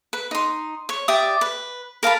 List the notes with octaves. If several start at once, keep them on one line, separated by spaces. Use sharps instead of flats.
B4
D#4 C6
C#5
G4 D5 E5 D#6
B4
A#4 F5 A5 B5